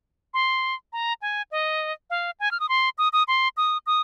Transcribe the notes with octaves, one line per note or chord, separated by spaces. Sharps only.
C6
A#5
G#5
D#5
F5
G#5
F6
D#6
C6
D#6
D#6
C6
D#6
D#6